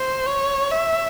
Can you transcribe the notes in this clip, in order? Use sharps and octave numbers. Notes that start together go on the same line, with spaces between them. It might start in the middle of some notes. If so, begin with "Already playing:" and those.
Already playing: C5
C#5
E5